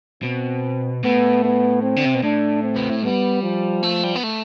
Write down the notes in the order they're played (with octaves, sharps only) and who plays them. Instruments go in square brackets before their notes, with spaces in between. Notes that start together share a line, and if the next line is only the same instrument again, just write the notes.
[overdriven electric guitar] B2 [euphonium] C4
[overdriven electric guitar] A2 [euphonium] B3
[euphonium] B3
C4
[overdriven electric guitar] D3
C3
B2
[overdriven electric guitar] A2 [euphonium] D4
[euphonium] C4
[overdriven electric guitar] B3
A3
[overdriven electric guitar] G3 [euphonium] B3
[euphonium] F3
[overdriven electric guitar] A3
G3
B3
A3